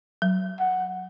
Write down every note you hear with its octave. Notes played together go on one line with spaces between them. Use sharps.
F#3
F#5